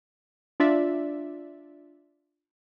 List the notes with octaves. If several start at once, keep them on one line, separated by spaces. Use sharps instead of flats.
D4 F4 D5 E5